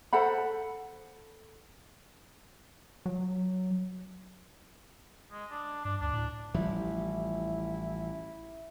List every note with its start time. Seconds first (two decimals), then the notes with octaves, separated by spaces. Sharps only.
0.13 A4 C5 F#5 B5
3.06 F#3
5.32 G#3
5.51 D4
5.85 G2 D4
6.01 D2 D4
6.13 A2
6.54 A1 F3 G3 E4